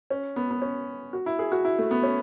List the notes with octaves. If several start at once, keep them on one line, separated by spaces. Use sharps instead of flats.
C#4
B3
B3
C#4
F#4
E4
G#4
F#4
E4
A3
B3
C#4